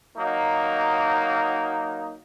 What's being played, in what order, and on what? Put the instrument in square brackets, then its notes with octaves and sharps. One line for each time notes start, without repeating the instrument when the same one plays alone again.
[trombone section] F#3 A#3 D#4